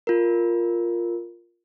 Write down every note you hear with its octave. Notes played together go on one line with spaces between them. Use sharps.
F4 A#4